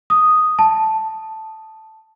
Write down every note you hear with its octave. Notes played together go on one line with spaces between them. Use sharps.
D#6
A5